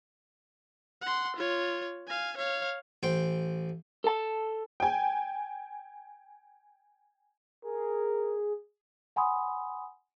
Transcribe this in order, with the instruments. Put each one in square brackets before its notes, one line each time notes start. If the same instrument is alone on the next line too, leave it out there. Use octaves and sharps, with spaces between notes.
[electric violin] F#5 C6
F4 C#5
F5 G#5
C#5 F5
[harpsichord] A1 C5 G5
[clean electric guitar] A4 A5
[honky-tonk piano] G5 G#5
[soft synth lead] G#4 [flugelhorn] A#4
[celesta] F#5 G#5 B5 C6 D#6